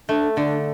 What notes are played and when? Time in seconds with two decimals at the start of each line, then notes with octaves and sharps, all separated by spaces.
0.09 A3 D4
0.37 D3 D4